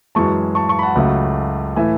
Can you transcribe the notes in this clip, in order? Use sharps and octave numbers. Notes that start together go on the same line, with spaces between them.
F#2 E3 G#3 A5 C#6
A5 C#6
A5 C#6
B5
F#5 A5
C#2 C#3 F#3 A3
A2 E3 A3 E5 G#5